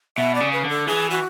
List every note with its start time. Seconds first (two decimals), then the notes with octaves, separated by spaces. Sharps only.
0.17 B2 E5
0.35 D5
0.40 C#3
0.52 B4
0.64 D3
0.69 A4
0.87 E3 G#4
1.11 F#4